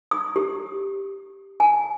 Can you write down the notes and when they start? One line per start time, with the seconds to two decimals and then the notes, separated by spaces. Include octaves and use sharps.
0.11 D#6
0.36 G4
1.60 G#5